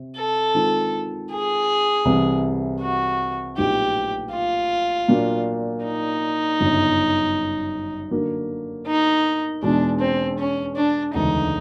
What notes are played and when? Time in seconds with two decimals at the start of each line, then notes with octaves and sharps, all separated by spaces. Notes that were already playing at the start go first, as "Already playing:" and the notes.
Already playing: C3
0.17 A4
0.55 D#3 G#3 C4 F4
1.30 G#4
2.05 C2 C3 E3
2.81 F#4
3.57 A#1 A2 F#3 B3 D#4 G4
4.32 F4
5.08 A#2 F#3 A#3 D4
5.84 D#4
6.60 G1 F#2 C#3
8.11 D3 F#3 A#3
8.87 D#4
9.62 E2 B2 G#3 D4
10.00 C4
10.38 C#4
10.76 D4
11.14 E1 D2 C#3 E3 G#3 D#4